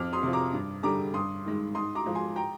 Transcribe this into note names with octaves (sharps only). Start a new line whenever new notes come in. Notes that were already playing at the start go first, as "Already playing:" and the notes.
Already playing: F2 D6 F6
C6 D#6
C3 F3
A#5 D6
G2
D3 G3 A#5 D6
G2 C6 D#6
D#3 G#3
G#2 C6 D#6
A#5 D6
F3 G#3
G#5 C6
G5 A#5